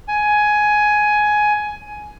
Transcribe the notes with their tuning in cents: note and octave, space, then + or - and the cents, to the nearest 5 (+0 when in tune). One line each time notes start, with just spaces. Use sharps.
G#5 +15